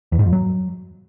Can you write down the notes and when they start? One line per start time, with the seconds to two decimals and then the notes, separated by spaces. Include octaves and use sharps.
0.12 E2
0.19 G#2
0.26 F2
0.33 F#3